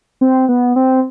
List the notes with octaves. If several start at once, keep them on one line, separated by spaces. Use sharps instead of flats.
C4
B3
C4